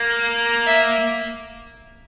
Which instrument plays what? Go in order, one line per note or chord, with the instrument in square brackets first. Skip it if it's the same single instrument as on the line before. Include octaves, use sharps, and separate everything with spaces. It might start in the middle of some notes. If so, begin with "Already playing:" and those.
Already playing: [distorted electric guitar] A#3
[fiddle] E5